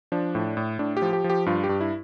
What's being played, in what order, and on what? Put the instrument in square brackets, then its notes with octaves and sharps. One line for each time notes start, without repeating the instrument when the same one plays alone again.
[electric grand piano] F3 D4
A2
A2
A2 D4
G4
F3
G4
F3
G4
G2 F4
G4
G2
E4